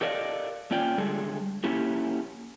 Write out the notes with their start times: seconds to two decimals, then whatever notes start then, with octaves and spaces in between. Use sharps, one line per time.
0.01 G4 A4 A#4 D5 D#5 F5
0.71 A#3 C#4 F4 D5 G5
0.98 D3 G3 G#3 G#4 A4
1.64 A#3 C#4 E4 G4 A4